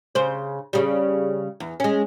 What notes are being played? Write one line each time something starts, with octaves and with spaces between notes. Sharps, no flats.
C#3 C5
C#3 G3
E2
G#3 C#4